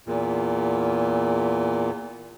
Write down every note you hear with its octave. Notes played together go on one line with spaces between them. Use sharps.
E2 A#2